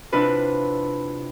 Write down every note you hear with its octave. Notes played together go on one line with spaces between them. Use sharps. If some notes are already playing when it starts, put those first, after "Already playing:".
C3 D4 E4 F4 B4